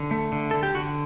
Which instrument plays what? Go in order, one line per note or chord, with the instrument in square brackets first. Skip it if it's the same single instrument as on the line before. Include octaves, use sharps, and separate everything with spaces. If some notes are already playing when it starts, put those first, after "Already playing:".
Already playing: [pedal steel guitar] D3
A3
D3
D3 A4
G4
D3 F#4